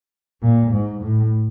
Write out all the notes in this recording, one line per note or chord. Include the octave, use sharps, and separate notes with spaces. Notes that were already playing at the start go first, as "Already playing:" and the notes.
A#2
G#2
A2